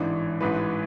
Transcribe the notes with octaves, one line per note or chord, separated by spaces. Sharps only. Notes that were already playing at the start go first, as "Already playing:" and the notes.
Already playing: A1 G#2 E3 D4
A1 G#2 E3 B4